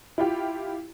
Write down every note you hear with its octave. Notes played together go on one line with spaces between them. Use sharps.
E4 F4 G4